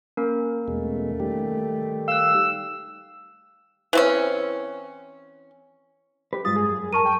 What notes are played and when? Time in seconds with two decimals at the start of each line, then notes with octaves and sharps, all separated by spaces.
0.17 A#3 C#4 A#4
0.68 E2 B2 G#3 A3
1.20 D#3 G3 G4
2.08 F5 E6 F#6
3.93 E3 C4 C#4
6.33 G4 B4
6.45 G2 G#3 F4 D#6 A6
6.56 G#4
6.69 F#2
6.93 A#4 A5 C#6 D#7
7.05 G5